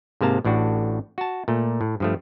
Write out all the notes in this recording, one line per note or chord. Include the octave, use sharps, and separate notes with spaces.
G#2 C3 A#3 A5
A1 A2 D4 F#4
F#4 A5
A#2 A3
A2
G2 F3 A3